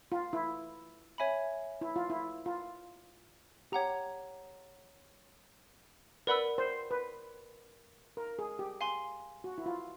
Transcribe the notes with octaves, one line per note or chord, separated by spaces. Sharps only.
F4
E4
C#5 E5 G#5 B5
E4
F4
E4
F4
G4 C#5 F#5 A#5
A#4 B4 D5 F#5 B5 E6
C5
B4
A#4
G#4
G4
F5 G#5 C6
F#4
E4
F4